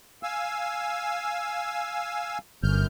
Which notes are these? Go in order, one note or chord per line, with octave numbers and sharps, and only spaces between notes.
F5 G#5 E6
G1 F#2 F6 G6